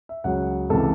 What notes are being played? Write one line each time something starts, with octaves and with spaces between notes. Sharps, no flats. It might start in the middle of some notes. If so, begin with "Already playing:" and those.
E5
C#2 C#3 F#3 F#5
C#2 C3 E3 A4